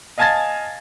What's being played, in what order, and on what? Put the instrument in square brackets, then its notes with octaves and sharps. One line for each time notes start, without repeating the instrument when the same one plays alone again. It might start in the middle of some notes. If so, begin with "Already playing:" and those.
[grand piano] D#5 F5 G#5 A5 G#6 A6